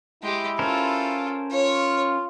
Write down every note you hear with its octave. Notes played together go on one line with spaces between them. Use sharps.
G#3 E4 G4
C#4 F4 A4 A#4 C5
F4 C#5